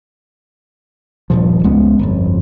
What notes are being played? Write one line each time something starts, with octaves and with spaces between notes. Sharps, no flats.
D#1 G2 A#2 F3
C#2 G#3 B3 C#4
G1 F2